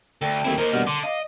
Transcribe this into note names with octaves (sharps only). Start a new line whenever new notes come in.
D2 A4 G5
D#2 F#3 A3 C4 E4
D#2 D#3 A#4 C5
G2 B2 F6
D3 C6 D6
D#5 F5